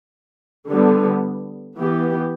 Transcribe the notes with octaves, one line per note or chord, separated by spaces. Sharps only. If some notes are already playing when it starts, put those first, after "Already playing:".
D3 G3 B3
E3 B3 G4